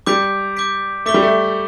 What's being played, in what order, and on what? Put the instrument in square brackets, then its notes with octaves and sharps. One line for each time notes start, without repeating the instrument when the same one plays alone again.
[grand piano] G3 [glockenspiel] D6 G6 B6 D7
[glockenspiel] D6 G6 B6 D7
[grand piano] A3 [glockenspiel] D6 B6 G7
[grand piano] G3
A3